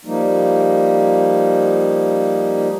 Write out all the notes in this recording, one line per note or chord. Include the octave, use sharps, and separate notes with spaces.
F3 G3 A#3 D#4